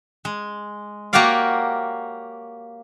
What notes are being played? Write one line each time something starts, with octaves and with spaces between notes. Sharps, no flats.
G#3
A#3 F#4 G4 C#5 D5 F5